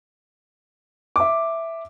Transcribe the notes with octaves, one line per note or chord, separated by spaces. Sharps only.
E5 D6